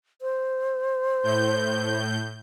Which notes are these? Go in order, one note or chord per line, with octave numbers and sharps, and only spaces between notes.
C5
A2 G6